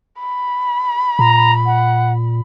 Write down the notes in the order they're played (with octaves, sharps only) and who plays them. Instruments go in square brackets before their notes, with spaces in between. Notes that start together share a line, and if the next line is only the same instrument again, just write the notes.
[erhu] B5
[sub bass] A#2 [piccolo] A#5
[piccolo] F#5